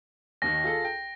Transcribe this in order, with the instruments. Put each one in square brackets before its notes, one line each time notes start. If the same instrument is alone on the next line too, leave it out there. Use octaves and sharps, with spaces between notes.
[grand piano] D#2 D#3 [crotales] A#6
[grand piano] F4 G#4 A4
G5